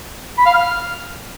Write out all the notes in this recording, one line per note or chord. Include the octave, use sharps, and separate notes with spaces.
B5
F5
F6